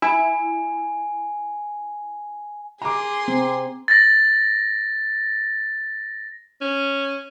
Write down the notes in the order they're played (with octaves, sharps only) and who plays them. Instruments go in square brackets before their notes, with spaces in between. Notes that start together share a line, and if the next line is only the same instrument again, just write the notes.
[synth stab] E4 [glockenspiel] G#5
[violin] G#4 C6 [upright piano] A#5 D6
[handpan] C4
[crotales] A6 A#6
[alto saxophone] C#4